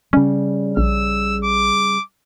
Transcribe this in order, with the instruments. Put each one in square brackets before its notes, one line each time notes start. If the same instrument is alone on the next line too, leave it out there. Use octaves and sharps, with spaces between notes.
[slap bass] C#3 G3 [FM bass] C#4
[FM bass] A#1 [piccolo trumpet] E6
[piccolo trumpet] D6